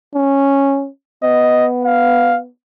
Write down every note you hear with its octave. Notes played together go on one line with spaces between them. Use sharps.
C#4
B3 D#5
F5